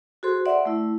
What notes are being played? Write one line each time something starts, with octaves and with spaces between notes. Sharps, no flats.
F#4 G#4 A4 C5 C6
D5 E5 F#5 C6
A3 E4